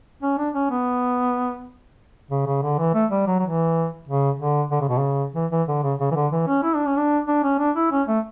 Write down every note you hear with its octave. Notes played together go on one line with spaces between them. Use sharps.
C#4
D4
C#4
B3
C#3
C#3
D3
E3
A3
G3
F#3
F#3
E3
C#3
D3
D3
C#3
B2
C#3
E3
E3
D3
C#3
C#3
E3
D3
E3
C#4
E4
D4
C#4
D4
D4
C#4
D4
E4
C#4
A3